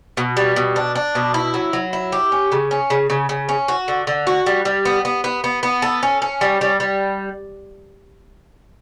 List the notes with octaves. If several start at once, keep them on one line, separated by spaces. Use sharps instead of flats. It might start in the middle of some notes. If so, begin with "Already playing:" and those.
B2
G3
B2
D4
D4
B2
E4
F#3
F#3
E4
G4
C#4
C#3
C#4
C#3
C#3
C#3
C#4
F#4
D3
D3
F#4
G3
G3
B3
B3
B3
B3
B3
A4
C#4
C#4
G3
G3
G3